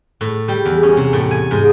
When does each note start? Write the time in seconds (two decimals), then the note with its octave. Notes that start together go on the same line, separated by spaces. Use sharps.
0.21 A2
0.48 G3
0.65 E2
0.83 C#4
0.97 C3
1.13 A2
1.31 G#5
1.51 G#2